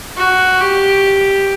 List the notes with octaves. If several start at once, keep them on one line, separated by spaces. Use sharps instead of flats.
F#4
G4